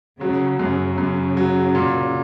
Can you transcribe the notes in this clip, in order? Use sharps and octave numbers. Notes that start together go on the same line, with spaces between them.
C#3 F#3
F#2 C#3
F#2
F#3
A#2